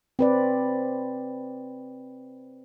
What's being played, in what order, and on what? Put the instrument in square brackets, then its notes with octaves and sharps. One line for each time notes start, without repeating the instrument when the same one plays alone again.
[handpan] C4 B4 D5